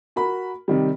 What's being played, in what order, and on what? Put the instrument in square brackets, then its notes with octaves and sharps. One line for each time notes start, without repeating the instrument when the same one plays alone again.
[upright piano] F#4 A#4 B5
C3 D#3 G3